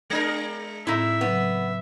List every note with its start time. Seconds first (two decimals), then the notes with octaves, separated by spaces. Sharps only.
0.10 G#3 D4 A#4 D5
0.87 A2 C4 D#4 E4 E5
1.21 C#3 F#3 B3